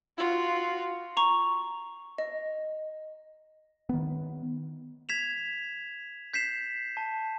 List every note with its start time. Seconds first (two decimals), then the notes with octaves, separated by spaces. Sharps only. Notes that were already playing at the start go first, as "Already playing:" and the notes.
0.18 F4 F#4
1.17 A#5 C#6
2.18 D#5
3.89 D#3 B3
5.09 G#6 B6 E7 F7
6.33 G6 B6 C7 E7
6.97 A5